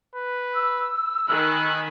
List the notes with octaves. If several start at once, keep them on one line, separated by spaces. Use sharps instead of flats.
B4
E6
D#3 G#5 B5 F#6